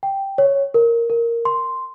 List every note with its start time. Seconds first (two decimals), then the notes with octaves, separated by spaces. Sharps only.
0.03 G5
0.38 C#5
0.74 A#4
1.10 A#4
1.45 C6